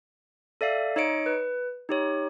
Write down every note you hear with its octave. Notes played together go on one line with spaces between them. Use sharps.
A4 D5 E5 F5
D#4 C#5 D#5 C#7 D7
B4
D#4 G4 C#5